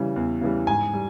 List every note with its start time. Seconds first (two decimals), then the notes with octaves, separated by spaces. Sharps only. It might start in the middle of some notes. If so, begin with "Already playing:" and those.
Already playing: C#3 E3 G3
0.16 E2
0.41 C#3 E3 G3
0.67 G#2 G#5
0.94 G3